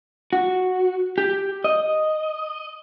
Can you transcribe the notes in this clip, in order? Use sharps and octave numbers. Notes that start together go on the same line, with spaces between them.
F#4
G4
D#5